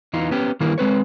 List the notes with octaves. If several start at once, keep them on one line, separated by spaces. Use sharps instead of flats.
E2 E3 D#4 F4
B3 C#4 G4
D#3 E3 G3 A#3 E4
G#3 C4 B4 C#5